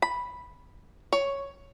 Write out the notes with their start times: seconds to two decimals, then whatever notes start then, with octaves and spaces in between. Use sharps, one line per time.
0.02 B5
1.13 C#5